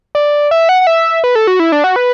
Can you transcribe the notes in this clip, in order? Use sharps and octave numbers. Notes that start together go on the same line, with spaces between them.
D5
E5
F#5
F#5
E5
B4
A4
F#4
E4
D4
F#4
B4